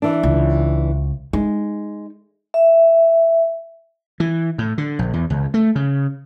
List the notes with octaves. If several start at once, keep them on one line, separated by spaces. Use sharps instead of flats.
E3 D4
C#2
G#3 D#4
E5
E3
A2
D3
A#1
E2
C#2
A3
C#3